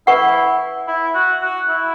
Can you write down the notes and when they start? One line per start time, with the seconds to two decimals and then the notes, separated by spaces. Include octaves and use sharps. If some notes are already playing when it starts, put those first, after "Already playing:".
0.07 E4 B4 F#5 C#6
0.88 E4
1.14 F#4
1.42 F#4
1.69 E4